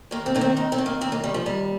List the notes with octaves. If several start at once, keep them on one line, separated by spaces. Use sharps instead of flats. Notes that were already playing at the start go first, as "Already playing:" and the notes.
D#2 A#3
C4
D#3 A#3
C4
D#2 D#4
C4
D#3
A#3
D#2 C4
A#3
D#3 G3
F3
D#2 G3